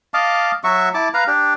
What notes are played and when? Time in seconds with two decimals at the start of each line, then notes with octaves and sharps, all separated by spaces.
0.14 D#5 F5 A5 D6
0.64 F#3 F#4 E5 C#6
0.94 E4 A5 D6
1.14 B4 F5 A#5
1.27 D4 G4